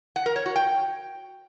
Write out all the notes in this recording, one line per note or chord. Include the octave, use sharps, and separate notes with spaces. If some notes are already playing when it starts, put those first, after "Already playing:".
F#5
A#4
C#5
F#4
G5